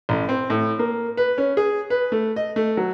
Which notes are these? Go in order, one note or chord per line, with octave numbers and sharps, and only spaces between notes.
A1
C4
A2
A#3
B4
C#4
G#4
B4
A3
D#5
A3
F#3